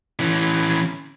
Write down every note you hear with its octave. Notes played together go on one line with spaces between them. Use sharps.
E3 C#4